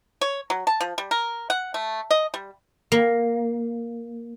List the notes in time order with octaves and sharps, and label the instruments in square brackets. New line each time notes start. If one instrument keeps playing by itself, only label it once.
[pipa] C#5
F#3
A5
F3
G3
A#4
F#5
A3
D#5
G3
[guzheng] A#3